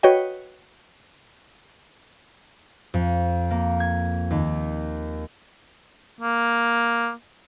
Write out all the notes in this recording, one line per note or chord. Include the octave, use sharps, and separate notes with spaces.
F#4 B4 C#5 D#5 G5
F2
A#3
G#6
D#2
A#3